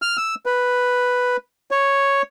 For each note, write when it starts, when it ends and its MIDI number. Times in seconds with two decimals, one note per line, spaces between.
0.02 0.17 89
0.17 0.35 88
0.46 1.37 71
1.71 2.22 73